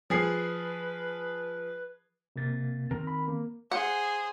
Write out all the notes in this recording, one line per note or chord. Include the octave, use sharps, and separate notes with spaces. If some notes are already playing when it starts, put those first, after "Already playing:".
F3 G#4 B4 C7
C3 A#3 A6
D#3 C4 A#4
B5
A#3
G#4 C5 F#5